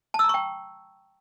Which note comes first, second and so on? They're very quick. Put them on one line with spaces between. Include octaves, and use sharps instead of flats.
A5 E6 A#5 C#6 G5